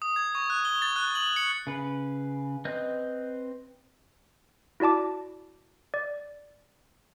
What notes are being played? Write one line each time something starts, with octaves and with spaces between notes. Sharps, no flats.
D#6
G#6
C#6
F#6
G7
A6
F#6
F#7
C#7
C#3 B4
C4 B4 D#5 G6
E4 F#4 D5 A5 D6
D5